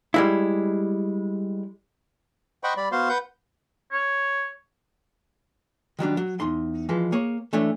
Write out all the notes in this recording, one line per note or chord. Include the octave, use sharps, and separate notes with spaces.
G3 G#3 E4
C5 D#5 F#5 G5 B5 C#6
G3 D5 B5
B3 F#4 C5 F5 C6
B4 F#5 G6
C#5
D#3 F#3 G3 D4
F#3
E2 D#4 C6
E3 F3 G#3 B4
A#3 G#4 C#5
E3 A3 D4 C#5